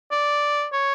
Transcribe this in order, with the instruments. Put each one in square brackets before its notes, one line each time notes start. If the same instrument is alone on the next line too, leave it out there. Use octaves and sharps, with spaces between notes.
[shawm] D5
C#5